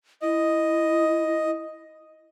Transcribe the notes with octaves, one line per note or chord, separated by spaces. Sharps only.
E4 D#5